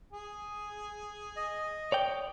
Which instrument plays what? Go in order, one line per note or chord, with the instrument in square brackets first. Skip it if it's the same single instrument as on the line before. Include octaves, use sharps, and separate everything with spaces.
[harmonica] G#4 G#5
[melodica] D#5
[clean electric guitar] C#5 D5 G5